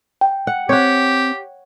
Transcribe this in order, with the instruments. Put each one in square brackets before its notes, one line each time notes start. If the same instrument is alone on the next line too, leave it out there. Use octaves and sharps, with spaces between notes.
[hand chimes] G5
[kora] F#5
[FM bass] C4 [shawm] G4 [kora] C#5 F#5